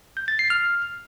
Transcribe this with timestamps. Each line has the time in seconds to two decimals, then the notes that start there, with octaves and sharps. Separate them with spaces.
0.17 G6
0.28 A6
0.39 C7
0.50 F6